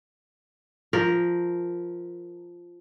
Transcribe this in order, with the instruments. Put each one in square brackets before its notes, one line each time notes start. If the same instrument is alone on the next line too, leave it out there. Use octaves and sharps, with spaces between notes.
[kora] F3 A#4